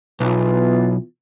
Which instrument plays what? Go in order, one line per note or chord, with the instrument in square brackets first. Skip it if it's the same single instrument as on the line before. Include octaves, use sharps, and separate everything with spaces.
[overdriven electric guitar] B1 [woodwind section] E3 B3 F4